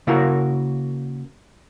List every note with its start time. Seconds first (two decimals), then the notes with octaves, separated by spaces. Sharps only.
0.07 C#3 A#3 E4 F#4 A#4